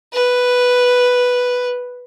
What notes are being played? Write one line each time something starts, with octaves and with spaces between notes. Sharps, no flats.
B4